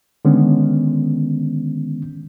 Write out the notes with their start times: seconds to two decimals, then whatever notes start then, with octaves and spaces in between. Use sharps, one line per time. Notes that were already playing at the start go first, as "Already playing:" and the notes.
0.25 D3 D#3 G#3 B3 C#4